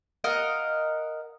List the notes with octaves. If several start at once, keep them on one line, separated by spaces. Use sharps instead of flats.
A#4 D#5 F5 F#5